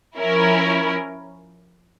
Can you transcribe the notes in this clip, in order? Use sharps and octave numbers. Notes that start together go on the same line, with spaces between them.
F3 C#4 E4 A#4